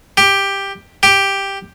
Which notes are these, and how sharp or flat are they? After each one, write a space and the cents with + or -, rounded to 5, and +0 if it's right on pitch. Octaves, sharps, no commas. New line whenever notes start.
G4 +10
G4 +5